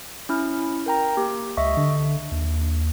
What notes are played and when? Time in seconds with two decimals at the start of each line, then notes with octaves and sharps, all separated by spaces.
0.29 C#4 E4 F6
0.86 A#4 G5 A#5
1.17 A#3 G4
1.57 C#2 D#5 E5 C#6
1.77 D3 D4
2.31 D#2